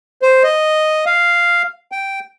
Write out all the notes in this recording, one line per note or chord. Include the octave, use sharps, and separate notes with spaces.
C5
D#5
F5
G5